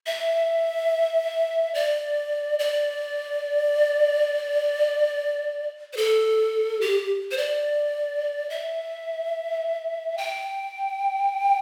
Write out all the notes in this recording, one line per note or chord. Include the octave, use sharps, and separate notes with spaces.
E5
D5
D5
C5
A4
G4
C5
D5
E5
G5